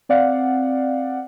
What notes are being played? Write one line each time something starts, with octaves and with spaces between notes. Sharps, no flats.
C4 D5 F5 F#5